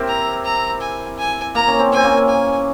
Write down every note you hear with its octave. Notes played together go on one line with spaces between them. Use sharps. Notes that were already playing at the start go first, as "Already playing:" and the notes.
Already playing: C4 E4 G4 A#4
A#5
A#5
G#5
G#5
A#3 A#5
C#4
C4
C4 G#5
A#3 C#4
G#5